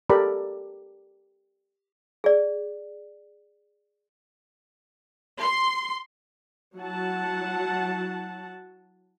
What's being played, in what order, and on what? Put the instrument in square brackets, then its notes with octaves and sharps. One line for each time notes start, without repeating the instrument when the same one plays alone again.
[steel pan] G4 A4 A#4 D5 B5
[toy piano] G#4 D5
[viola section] C6
F#3 E4 F#5 A5